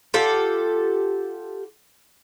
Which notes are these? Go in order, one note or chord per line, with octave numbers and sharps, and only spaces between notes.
F4 G4 A4 F#5